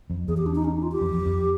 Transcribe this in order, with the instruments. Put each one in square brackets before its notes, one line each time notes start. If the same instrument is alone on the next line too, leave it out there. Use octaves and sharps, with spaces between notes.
[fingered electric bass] F2
[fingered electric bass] E2 [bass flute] G#4
[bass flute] G4
D4
D#4
C#4
D#4
F4
G4
[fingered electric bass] F2
F2
F2